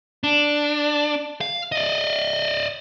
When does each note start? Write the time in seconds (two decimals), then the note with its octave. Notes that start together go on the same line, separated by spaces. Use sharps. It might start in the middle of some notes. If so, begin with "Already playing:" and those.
0.24 D4
1.41 F5
1.72 D5 D#5